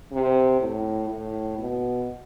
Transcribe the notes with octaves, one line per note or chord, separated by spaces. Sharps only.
C3
A2
A2
B2